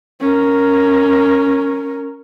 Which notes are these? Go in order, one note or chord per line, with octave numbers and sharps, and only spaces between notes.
C#4 A#4